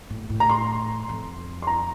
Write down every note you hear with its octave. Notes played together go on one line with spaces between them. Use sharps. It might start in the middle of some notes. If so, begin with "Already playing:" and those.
A2
A2
A#5
C6
F2
C6
A#5